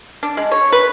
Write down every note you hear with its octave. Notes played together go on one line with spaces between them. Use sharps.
D4
G#3
C#5
B4